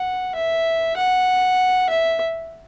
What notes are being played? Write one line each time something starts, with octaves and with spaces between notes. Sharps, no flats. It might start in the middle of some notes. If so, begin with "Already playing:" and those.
Already playing: F#5
E5
F#5
E5